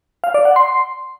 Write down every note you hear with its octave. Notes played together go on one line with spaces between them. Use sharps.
F5
D5
F#5
C6